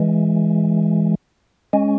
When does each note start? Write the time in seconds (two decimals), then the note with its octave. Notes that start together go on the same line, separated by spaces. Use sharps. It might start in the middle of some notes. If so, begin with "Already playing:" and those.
Already playing: E3 G#3
1.73 G#3 C#4